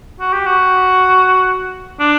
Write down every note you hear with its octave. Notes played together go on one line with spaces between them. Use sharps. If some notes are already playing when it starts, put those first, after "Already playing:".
F#4
G4
F#4
D4